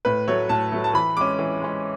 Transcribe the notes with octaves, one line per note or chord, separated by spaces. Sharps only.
A2 B4
F#3 A3 C#5
A2 A5
F#3 A3
A5
E3 B5
G#3 C#4 D6
E3
G#3 C#4